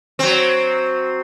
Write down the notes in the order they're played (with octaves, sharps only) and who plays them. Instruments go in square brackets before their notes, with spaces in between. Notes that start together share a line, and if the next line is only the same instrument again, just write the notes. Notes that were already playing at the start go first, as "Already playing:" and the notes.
[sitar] F#3 C4